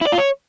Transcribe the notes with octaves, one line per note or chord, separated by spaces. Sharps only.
E4
D5
F4
C#5